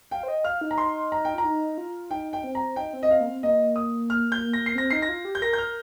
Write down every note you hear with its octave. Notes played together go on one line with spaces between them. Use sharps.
F5 G5
C5
D#5
F5 F6
D#4
A#5
C6
A#5
G5
F4 A#5
D#4
F4
D#4 G5
G5
C4
A#5
D#4 G5
C4
D#5
C4 F5
A#3
C4
A#3 D#5
D#6
F6
G6
A#6
C7
C4 A#6
D#4 C7
A#6
F4
G4
G6
A#4 A#6
G6
F6
A#4